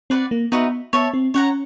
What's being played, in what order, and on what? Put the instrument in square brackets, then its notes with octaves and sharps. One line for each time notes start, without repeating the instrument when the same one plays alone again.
[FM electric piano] C4 [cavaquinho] B4 D5 F#5
[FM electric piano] A#3
[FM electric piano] B3 [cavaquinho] D#4 F#4 B4 E5
[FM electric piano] B3 [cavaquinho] C#5 E5 A5
[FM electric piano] C4
[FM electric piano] C#4 [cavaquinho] C#5 F#5 A#5